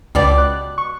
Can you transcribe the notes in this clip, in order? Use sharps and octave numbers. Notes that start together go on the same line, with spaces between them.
C#2 B2 G4 D5
F#6
C#6